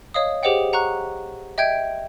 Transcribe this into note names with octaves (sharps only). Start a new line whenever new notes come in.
C#5 D#5 F5 D#6
G4 G#4 C5 D#5 F#5 G5
F#5 A#5 C#6 F#6
D#5 E5 G5 G6 G#6 D7